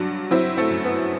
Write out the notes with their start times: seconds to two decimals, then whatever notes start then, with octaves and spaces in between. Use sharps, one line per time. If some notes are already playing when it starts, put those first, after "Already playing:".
Already playing: G2 F#3
0.31 F#3 C4 E4
0.57 A3 C4
0.70 F#2
0.84 B3